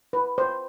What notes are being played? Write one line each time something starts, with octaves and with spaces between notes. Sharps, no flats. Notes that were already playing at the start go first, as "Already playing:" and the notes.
B4
C5